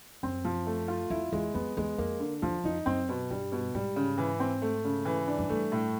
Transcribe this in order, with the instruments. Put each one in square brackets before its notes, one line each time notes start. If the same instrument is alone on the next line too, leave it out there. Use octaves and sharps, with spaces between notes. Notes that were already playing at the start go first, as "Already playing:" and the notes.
[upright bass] F#2 [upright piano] C4
[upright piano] F3
A3
F4
[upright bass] F2 [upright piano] E4
[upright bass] E2 [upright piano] G#3
[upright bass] F2 [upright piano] B3
[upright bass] E2 [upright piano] G#3
[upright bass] F2 [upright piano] A#3
[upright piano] D3
[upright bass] E2 [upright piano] F3
[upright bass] F2 [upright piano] D#4
[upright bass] F#2 [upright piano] C4
[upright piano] B2
[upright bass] G2 [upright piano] G3
[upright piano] B2
[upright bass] G#2 [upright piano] G3
[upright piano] C#3
E3
C4
A3
C#3
E3
D4
[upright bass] F#2
[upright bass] G2 [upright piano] A3
[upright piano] A2